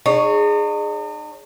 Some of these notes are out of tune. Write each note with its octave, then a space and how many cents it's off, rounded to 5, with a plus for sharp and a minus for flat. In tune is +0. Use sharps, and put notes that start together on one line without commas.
D#4 -45 G#4 +0 C#5 +0